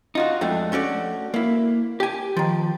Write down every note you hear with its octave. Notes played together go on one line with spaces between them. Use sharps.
D#4 F4 F#4
F2 G#3 A3 D4
A3 C#4 F#4 D5
A#3 E4
G4 G#5
D#3 F3